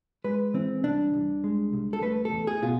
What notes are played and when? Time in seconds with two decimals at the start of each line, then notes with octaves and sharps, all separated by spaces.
0.24 G#3 B4
0.54 E3 C4
0.84 C2 D4
1.14 C2
1.44 G#3
1.73 C2
1.93 A4
2.02 A3 B4
2.25 A4
2.32 E2
2.47 G#4
2.62 B2 F4